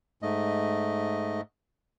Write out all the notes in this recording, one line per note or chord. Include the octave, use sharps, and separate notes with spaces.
G#2 A3 D#5